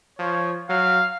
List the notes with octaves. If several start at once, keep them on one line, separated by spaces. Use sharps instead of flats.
F3 C#5
F#3 F5